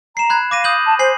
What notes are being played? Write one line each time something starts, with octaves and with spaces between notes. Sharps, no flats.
A#5 C7 E7
B5 F#6 G#6
F5 D6 A#6 D#7
D#6 G6 F#7
A5
C5 G#5 C7 F#7